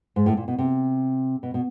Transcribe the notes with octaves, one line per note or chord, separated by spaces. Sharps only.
G#2
A2
A#2
B2
C3
B2
B2